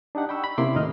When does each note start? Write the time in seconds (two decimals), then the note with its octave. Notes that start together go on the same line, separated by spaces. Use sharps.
0.15 D4 D#4 G4 F#5
0.29 G5 B5 C#6 E6
0.44 B5
0.58 C3 A#3 C#4 E4 C6 D6
0.75 D#2 A2 D#4 D#5 F6